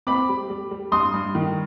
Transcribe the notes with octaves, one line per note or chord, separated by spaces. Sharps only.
C4 B5 D6
G3
G3
G3
G2 C6 D#6
G2
D#3